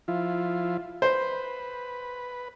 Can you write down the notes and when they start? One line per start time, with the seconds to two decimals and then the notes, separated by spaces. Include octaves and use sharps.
0.08 F3 E4 F4
1.02 B4 C5